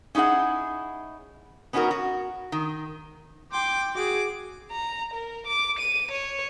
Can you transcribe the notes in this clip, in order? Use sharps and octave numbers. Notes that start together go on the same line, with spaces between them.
C#4 D#4 E4 G#4 F#5
B3 C#4 D#4 F4 F#4 A#4
F#4
D#3
G5 C6 D6
F#4 G#4 D6
A#5
A#4
D6
D#7
C#5